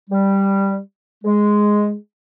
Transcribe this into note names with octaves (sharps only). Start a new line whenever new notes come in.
G3
G#3